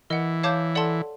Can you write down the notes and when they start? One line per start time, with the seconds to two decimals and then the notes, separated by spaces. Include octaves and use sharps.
0.10 E3 A#4 D#5 F#5
0.43 C#5 F5 A5 D6 G6
0.75 A4 D5 F#5 A5 C6